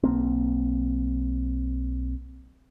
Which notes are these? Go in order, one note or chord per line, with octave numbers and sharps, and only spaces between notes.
B1 A#3 C4